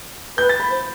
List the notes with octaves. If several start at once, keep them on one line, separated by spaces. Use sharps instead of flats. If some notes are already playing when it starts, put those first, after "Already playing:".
B4 G6
A6
B5
C5